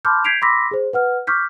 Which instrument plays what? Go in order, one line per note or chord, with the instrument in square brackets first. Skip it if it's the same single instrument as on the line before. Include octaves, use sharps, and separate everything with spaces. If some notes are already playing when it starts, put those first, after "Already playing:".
[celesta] A5 B5 C6 D6 F6 G6
G6 G#6 B6 C7 D7 F7
B5 C6 D6 E6 A#6 B6
G#4 C5
B4 F#5 F6
C#6 D6 F6 G6 B6